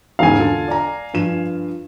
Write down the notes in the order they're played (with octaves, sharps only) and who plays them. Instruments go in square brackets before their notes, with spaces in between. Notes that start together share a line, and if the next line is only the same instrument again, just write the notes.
[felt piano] E1 G#2 C#3 [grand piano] F5 G#5
[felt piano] D3 F4 A4
D5 A#5
G2 F3 E7